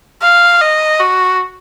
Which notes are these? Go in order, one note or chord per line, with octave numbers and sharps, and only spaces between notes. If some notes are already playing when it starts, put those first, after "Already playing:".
F5
D#5
F#4